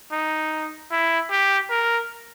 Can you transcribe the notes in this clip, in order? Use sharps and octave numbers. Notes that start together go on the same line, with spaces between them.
D#4
E4
G4
A#4